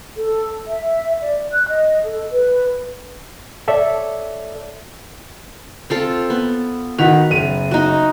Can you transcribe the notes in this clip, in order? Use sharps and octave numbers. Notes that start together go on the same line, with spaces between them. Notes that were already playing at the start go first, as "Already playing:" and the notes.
A4
E5
D5
F#6
D#5
A4
B4
A4 C#5 D5 E5
C4 F4 A4
B3
D#3 F#4 B4 F7
F#1 D#7
D#4 F#4